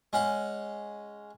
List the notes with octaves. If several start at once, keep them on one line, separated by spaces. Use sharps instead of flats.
G#3 C#4 F#5